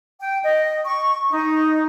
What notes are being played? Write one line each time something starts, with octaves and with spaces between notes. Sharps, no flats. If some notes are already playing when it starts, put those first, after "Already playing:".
G5
D#5
C#6
D#4